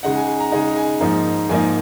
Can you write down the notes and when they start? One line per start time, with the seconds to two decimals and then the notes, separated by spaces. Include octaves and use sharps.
0.03 C#3 G#3 D#4 F#5
0.16 G#5
0.28 G#5
0.40 A#5
0.52 C#3 G#3 D#4 G#5
0.76 G#5
1.00 G#2 F3 A#3 D#4
1.49 G#2 F3 A#3 D#4 G#5